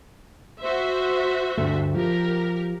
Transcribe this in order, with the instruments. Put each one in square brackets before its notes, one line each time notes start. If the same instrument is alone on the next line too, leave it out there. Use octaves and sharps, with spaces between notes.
[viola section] F#4 C5 E5
[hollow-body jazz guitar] D2 G2 A3
[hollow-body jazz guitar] F3 [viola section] G4 A#4